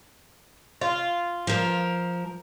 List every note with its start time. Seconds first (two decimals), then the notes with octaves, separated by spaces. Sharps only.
0.81 F4
1.47 F3 A#4